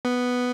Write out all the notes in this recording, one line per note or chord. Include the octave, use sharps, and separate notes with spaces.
B3